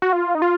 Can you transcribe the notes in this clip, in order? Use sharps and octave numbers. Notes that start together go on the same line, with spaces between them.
F#4
F4
D#4
F4